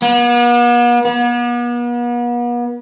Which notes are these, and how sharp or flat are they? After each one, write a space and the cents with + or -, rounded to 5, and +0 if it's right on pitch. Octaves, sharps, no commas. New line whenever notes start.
B3 -45
B3 -40